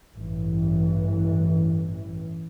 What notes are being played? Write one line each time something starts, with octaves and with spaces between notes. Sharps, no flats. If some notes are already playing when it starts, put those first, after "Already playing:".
A1 G2 E3